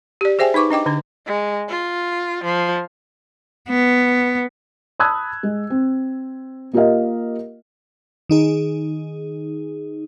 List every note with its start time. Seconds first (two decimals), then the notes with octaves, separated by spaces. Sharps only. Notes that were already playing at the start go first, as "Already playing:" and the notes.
0.21 G4 D5
0.39 G#4 C5 E5 G5 G#5
0.54 D#4 B4 C#6 D6
0.70 D4 D#5 G5 D6
0.86 D3 D4 B4
1.26 G#3
1.69 F4
2.44 F3
3.69 B3
5.00 A5 B5 D#6 E6 F#6 G#6
5.43 G#3
5.70 C4
6.73 A#3 F4 G4 A#4 D#5 F5
8.29 D#3 D#4 G#4